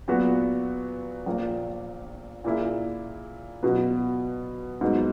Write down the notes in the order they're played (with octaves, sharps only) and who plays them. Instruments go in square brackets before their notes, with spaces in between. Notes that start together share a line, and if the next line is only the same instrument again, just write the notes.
[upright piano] A#2 F#3 B3 F#4
A#1 A#2 A#3
A#2 A#3 E4 G#4
B2 F#3 B3
G#2 F#3 B3 D#4